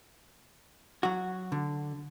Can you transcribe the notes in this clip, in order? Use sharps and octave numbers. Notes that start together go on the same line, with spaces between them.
F#3 F#4
D3